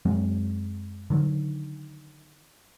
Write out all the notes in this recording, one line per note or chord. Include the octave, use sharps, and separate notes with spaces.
F#2 F#3 G#3 C4
D3 D#3 F#3